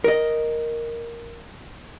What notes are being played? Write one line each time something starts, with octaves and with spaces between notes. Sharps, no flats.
A#4 D#5